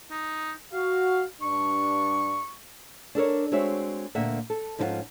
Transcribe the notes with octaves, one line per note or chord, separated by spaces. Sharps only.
D#4
F#4 F5
G2 D4 C#6
D4 A4 A#4 C#5
G#3 C4 F#4 C#5 E5
D2 A#2 D3 A#3 E5 F#5
A4
G#2 F3 C#4 E4 F4 F#5